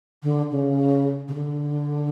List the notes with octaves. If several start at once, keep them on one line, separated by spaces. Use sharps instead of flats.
D3
C#3
C#3
D3